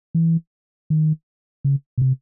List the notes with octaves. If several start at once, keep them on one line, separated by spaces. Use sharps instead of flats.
E3
D#3
C#3
B2
C3